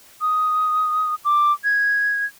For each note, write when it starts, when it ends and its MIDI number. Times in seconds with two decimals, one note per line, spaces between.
0.21 1.15 87
1.25 1.52 86
1.64 2.25 92